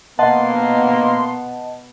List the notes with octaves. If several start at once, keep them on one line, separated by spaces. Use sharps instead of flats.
B2 A#3 B3 D#5 F#5 A5 C6